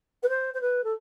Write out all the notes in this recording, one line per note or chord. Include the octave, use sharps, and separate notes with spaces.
B4
C5
C5
B4
A4